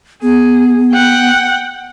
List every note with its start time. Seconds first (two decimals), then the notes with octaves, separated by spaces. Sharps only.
0.22 B3 G#4
0.93 F#5 G5